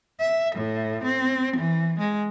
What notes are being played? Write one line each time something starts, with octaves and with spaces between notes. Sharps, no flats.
E5
A2
C4
E3
G#3